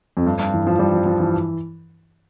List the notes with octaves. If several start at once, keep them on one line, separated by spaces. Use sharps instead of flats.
F2
G2
G2
E3
F3
G3
F3
F3
E3